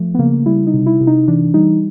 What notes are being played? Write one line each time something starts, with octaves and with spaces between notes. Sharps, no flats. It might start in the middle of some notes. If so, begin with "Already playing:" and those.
Already playing: F3 A3
B3
C#3 A#3
G3 E4
D#4
C3
E4
C3
D#4
E3 D4
G3 D#4